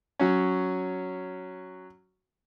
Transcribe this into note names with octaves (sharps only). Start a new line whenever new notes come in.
F#3 C#4